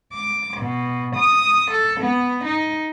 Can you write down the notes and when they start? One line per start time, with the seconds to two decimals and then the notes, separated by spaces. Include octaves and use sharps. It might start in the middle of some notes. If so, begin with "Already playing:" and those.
0.13 D6
0.57 B2
1.16 D#6
1.71 A4
2.01 B3
2.45 D#4